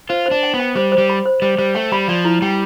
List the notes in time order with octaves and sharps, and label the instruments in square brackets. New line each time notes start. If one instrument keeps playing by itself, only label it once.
[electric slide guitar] F4 [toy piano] C5
[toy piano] C5
[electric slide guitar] D4
[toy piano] G5
[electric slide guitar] B3
[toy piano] G5
[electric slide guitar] G3 [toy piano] C5
[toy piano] C5
[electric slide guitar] G3
[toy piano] B5
C5
[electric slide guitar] G3 [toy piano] C5
[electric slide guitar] G3 [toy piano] C5
[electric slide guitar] A3 [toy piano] G5
[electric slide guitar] G3 [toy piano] B5
[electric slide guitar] F3 [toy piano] D5
[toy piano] E4
[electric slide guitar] G3 [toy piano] G5